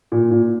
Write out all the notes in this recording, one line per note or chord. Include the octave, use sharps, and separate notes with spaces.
A#2
A#2